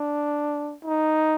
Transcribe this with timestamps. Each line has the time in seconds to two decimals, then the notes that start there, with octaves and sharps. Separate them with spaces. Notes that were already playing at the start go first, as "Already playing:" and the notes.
Already playing: D4
0.84 D#4